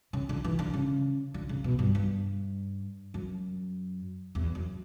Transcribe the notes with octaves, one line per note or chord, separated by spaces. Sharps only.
C#3
D3
E3
D3
C#3
D3
C#3
B2
G2
G2
F#2
E2
F#2